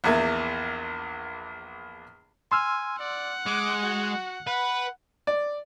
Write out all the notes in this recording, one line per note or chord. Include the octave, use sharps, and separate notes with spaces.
A#1 E2 A#3 E5
G#5 C6 E6 F6
D5 F#5
G#3 D6
F#4
B4 F#5
D5